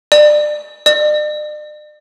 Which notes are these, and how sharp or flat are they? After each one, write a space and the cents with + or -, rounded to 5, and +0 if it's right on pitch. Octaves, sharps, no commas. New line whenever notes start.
D5 +25
D5 +45